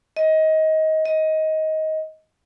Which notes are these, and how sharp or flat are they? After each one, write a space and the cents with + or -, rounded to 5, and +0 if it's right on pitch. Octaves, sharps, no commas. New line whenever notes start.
D#5 +20
D#5 +15